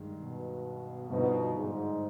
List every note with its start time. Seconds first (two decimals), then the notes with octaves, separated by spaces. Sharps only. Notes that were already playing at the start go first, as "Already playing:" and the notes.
Already playing: G2 D#3 G#3
0.21 B2
1.10 G2 B2 D3 F3 C4 D#4
1.55 G#2